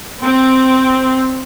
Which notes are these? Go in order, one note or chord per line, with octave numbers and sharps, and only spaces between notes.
C4